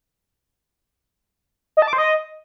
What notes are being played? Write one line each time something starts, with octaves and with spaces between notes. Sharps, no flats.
D#5
A5
D6
C5
D#5